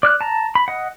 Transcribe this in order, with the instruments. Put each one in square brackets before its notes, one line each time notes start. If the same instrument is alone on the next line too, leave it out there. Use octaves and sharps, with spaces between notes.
[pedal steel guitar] D5 F6 F#6
A5 A#5
B5
D#5 F#5